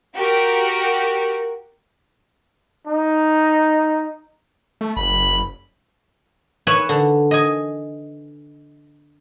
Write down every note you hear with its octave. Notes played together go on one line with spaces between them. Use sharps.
F#4 G4 A#4
D#4
A3
F#1 B5
B4 C#5 E5 G#5 B5
D3
D#5 G#5